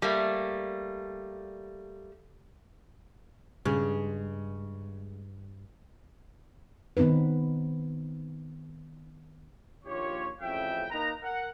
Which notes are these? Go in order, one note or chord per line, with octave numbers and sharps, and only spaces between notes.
G3 A3 A#3
G2 C#3 G#3
D#3 B3 C4 D#4 B4
A#1 D#2 F4 G4 C#5
A1 F2 C#3 E5 G5
A#3 D#4 A#4 B4 A#5
A#4 F#5